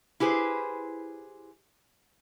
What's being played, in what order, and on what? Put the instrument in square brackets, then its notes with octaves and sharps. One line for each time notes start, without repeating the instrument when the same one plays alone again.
[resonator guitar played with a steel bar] E4 G4 G#4 B4 C5